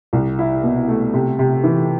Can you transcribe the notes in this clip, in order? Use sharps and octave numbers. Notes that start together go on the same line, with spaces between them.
C2
E4
B2
A3
C3
C3
E3